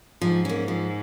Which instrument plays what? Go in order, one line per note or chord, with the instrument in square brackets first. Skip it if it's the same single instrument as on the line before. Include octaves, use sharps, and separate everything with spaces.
[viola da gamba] G#2 [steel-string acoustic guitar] F3
[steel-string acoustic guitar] A#3 C#4
F3